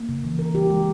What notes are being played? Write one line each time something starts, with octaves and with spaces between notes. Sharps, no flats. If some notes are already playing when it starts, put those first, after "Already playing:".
Already playing: A#3
C#3
E3
A#4
G4
G#3